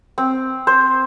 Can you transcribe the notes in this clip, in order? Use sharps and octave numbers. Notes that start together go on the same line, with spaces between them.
C4
C5